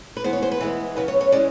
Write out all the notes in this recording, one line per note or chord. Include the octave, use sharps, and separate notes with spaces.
B4
E3 G#3 B3 C5
C#5
C5
B4
E3 G#3 B3
C#3 F#3 B3 B4
C#5
C#5
E3 G#3 C#4 D5